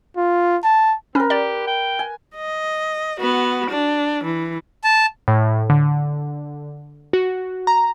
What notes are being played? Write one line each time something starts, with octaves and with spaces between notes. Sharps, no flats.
F4
A5
C4 C#4 A#4 B4
G4 D5
G5
G#5
D#5
B3 F#4
D4
E3
A5
A2
D3
F#4
A#5